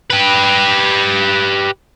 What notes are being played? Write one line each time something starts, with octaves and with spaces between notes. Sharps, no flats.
G4 B4